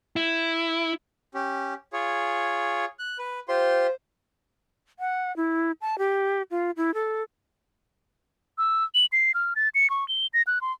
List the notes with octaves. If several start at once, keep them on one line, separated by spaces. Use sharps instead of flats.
E4
C#4 G4
F4 G#4 C#5
F#6
B4
F4 G4 C5 C6
F#5
E4
A5
G4
F4
E4
A4
E6
F#7
C7
F6
A6
C#7
C#6
G7
A#6
F#6
C6